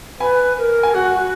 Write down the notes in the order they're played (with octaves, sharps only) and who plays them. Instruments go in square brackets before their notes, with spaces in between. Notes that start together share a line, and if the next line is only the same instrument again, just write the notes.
[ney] B4 [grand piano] G#5 B5
[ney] A#4
[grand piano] G#5
[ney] F#4 [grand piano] F#5
[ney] F#4